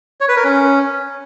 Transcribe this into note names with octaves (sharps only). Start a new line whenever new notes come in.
C#5
B4
A#4
C#4